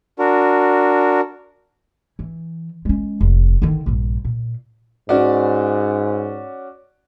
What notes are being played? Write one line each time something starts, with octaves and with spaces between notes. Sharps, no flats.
D4 F#4 A#4
E3
G#3 C#4
F1
D3 D#3
A#1 G2
A#2
G#2 C#4 F#4 D5